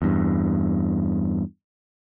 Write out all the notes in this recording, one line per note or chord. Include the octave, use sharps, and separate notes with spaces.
E2 G2